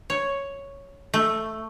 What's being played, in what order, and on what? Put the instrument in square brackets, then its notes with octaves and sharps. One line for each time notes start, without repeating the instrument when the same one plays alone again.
[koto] C#5
A3